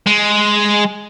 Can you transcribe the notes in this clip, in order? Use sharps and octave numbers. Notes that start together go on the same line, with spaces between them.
G#3